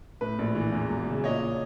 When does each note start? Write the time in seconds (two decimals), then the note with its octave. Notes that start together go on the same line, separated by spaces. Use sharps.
0.21 A2 B4
0.39 A#1
0.55 E3
0.72 E2
0.90 E1
1.07 C#3
1.24 A#2 C#5 D#5